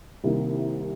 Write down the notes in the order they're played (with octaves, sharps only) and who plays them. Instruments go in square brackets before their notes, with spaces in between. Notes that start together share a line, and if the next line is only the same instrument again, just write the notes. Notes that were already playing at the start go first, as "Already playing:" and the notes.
[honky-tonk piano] C2 C3 D#3 A#3 D#4